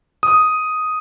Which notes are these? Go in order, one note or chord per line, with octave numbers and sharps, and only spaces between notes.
D#6